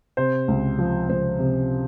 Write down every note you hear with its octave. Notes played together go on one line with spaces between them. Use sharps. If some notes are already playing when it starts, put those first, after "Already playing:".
C3 C5
C#2
F3
C#2 C5
C3